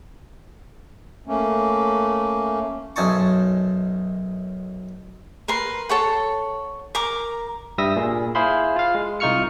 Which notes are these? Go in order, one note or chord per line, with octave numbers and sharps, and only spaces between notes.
A3 A#3 C#4
B1 F#2 D#4 G#5 A5 C#6
A#4 B4 C6
A4 C#5 F#5
A#4 A#5 D6
G2 G3 E5 D#6 E6 A#6
A#2 G#4
E4 G#4 C5 F5 B5 C6
F4 F5
G#3
C2 D#4 F4 C#6 F6 C#7